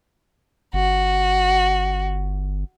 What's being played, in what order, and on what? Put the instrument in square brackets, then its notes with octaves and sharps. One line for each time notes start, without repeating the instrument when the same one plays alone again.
[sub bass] G1 [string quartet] F#4